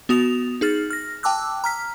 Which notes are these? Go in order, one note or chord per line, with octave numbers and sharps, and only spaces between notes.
B3 F#4 D#6 F7
D#4 G#4 F6 A6
F6 A#6
G5 A5 D6 E6 F#6
A#5 F6 B6